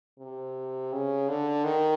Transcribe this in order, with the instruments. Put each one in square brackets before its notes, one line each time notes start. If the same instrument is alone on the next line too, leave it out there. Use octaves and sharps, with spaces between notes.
[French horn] C3
C#3
D3
D#3